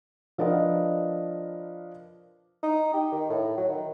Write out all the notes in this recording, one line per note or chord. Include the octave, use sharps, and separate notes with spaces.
F3 D4 A#4 B4 D#5
D#4
G4
D#3
A2
F#3
D#3